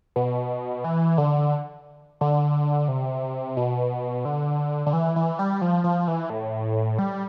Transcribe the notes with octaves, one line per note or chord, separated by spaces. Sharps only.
B2
E3
D3
D3
C3
B2
D3
D3
E3
E3
G3
F3
F3
E3
A2
G3